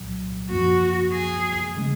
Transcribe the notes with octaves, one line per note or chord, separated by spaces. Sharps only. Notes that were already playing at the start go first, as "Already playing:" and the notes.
Already playing: C2 A#2 F#3
F#2 F3 A#3 F#4
G#4
C#3 G#3